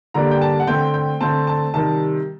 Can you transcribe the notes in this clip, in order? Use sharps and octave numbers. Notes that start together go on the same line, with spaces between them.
D3 G3 A#3 D4 A#5
G5
A5
F#5
D3 A3 C4 G5
G5
D3 A3 C4 A5
A5
C3 D#3 G3 A5